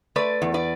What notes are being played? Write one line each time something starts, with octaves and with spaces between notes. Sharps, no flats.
A3 B4 D5
E2
B4 D5